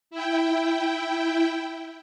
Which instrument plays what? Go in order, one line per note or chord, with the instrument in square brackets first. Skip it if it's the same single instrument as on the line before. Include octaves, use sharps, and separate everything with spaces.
[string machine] E4 G5